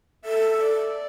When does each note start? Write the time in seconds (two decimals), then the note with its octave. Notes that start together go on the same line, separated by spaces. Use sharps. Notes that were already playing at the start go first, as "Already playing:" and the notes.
0.25 A4 E5
0.64 D5